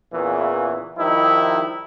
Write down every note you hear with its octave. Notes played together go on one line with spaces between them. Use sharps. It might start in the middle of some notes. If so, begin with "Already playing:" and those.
E2 A#2 C#3 E3
D#3 F3 G3 D#4 E4